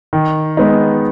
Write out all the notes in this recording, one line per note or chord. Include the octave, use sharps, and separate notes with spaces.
D#3
G#3 B3 D#4